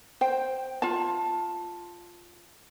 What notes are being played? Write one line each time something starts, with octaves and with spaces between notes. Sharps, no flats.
C5 G5
F4 A5